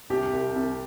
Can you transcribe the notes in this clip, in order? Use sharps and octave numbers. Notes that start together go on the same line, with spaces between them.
C2 G4
C2
C2